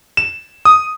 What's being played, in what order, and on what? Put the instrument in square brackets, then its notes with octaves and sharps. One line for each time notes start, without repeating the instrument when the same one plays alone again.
[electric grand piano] E7
D#6